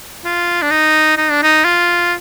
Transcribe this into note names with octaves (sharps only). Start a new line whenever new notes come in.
F4
D4
D#4
D#4
D4
D#4
F4